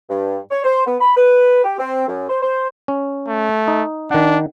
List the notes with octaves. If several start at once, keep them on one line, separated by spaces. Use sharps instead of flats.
G2
C#5
C5
B3
B5
B4
G4
C4
F#2
C5
C5
C#4
A3
D#4
D#3 D4 F#5